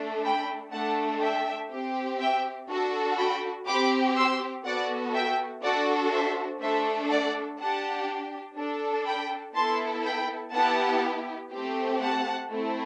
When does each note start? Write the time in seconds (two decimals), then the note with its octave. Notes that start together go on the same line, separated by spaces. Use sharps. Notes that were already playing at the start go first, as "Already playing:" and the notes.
Already playing: A3 D4 A4
0.24 G5 B5
0.73 A3 D4 A4 F#5 A5
1.22 E5 G5
1.71 C4 G4
2.20 E5 G5
2.69 D4 F#4 A4
3.18 G5 B5
3.67 C4 G4 B5 D6
4.16 C6 E6
4.65 B3 F#4 A4 D5 F#5
5.14 E5 G5
5.63 D4 F#4 A4 D5 F#5
6.13 C5 E5
6.61 A3 D4 A4 C5 E5
7.10 D5 F#5
7.60 D4 G4 F#5 A5
8.57 D4 A4
9.06 G5 B5
9.55 B3 E4 A4 A5 C6
10.04 G5 B5
10.54 B3 E4 G4 F#5 A5
11.52 A3 C4 G4
12.01 F#5 A5
12.50 A3 C4 E4